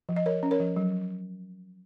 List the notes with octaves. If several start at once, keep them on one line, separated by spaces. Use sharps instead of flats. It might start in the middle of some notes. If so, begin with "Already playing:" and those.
F3
D#5
F3 A#4 C#5
C#4
A#4 C#5
F3
F#3